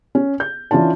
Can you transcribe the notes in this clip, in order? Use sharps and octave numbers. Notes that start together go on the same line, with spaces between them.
C#4
G6
E3 C#4 D4 F4 A5